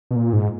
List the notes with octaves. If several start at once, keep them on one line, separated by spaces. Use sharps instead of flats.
B2
A#2
G#2